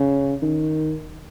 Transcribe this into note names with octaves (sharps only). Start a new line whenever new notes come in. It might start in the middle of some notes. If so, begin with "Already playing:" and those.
Already playing: C#3
D#3